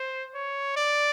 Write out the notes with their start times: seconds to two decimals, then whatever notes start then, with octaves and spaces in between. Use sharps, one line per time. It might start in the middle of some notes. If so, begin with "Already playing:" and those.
Already playing: C5
0.35 C#5
0.77 D5